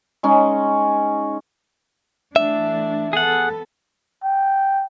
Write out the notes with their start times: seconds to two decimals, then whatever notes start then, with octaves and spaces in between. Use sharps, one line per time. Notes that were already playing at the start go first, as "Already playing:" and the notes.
0.23 G#3 C#4 D#4
2.36 E3 A3 D4 E5
3.13 B3 G#4 A4 F#5
4.24 G5